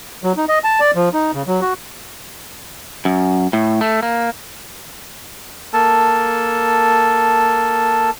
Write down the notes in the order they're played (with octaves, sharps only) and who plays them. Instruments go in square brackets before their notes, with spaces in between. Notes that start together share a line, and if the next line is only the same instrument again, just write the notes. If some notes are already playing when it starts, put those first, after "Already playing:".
[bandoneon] F#3
D#4
D#5
A5
D5
F3
D#4
C#3
F#3
F#4
[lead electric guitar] F#2
A2
A3
A#3
[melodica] A#3 A4 A5